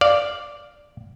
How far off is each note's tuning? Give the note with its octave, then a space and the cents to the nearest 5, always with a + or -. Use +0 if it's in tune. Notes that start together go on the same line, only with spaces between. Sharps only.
D5 +0 F5 +0